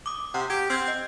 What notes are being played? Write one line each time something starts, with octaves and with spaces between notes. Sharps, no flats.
D6 D#6
C3 F#5
G4 G#6
C4 E6 F6 G#6
D#5